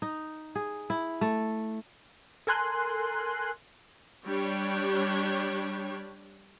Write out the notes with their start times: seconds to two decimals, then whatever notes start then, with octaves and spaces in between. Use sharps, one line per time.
0.02 D#4
0.55 G#4
0.90 E4
1.21 A3
2.47 A4 A#4 G#5 C6 F#6
4.26 G3 D4 G4 C#5